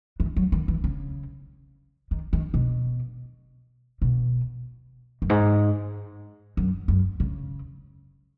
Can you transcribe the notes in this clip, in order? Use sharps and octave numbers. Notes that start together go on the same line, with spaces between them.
E3
F#3
D#3
E3
C#3
D#3
D#3
B2
B2
F#2
G#2
F#2
F#2
C#3